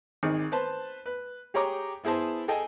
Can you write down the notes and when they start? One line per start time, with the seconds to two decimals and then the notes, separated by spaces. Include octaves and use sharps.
0.23 G#1 D#3 G#4
0.52 B4 C5 A5
1.06 B4
1.54 G4 G#4 C#5 G5 A#5 D6
2.04 B3 E4 G#4 C5 A5
2.48 G#4 A4 D#5 G5 G#5